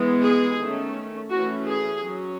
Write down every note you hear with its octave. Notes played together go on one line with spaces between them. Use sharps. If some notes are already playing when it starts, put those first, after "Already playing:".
Already playing: E3 G#3 B3
G#4
D#3 A3 C#4
E3 A3 C#4 F#4
G#4
F#3 C#4